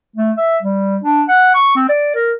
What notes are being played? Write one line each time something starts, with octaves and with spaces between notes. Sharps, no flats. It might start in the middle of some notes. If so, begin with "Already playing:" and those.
A3
E5
G3
D4
F#5
C#6
C4
D5
A#4